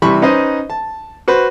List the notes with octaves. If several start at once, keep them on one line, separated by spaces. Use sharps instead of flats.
C3 E3 G3 B5 C#6
C#4 D#4 B4 C5 D#5
A5
F#4 B4 C5